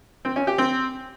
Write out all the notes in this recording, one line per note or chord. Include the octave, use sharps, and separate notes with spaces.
C4
C#4
G4
C4